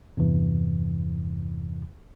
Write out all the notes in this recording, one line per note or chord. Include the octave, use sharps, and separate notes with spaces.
E2 G2 C3 E3